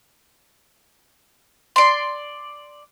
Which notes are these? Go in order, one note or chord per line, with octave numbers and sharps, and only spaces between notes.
D5 C6